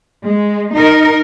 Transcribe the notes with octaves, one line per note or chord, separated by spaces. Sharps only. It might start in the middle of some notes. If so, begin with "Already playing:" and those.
G#3
D#4 A#4